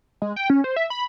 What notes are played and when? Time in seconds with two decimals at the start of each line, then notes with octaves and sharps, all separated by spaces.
0.22 G#3
0.36 G5
0.50 C#4
0.64 C5
0.76 E5
0.90 B5